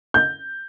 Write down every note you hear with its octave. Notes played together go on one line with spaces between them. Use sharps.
G6